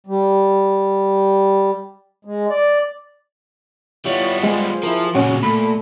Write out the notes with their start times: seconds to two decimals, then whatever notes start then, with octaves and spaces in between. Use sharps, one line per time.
0.07 G3
2.25 G#3
2.50 D5
4.05 G3 B3 E4 F4 C#5
4.43 G#3 F4 G#4 C5
4.83 F3 E4 A#4
5.15 A#2 C#3 C#4 F#4
5.43 A#2 A3 B5